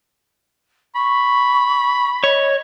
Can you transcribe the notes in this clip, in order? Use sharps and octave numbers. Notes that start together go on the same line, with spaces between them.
B5 C#6
C#5 D#5